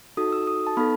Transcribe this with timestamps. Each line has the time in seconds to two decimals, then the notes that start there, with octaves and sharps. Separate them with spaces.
0.17 D#4 F#4 A4 D#6
0.32 E6
0.47 D#6
0.67 A5
0.77 B3 D#4 A4 B5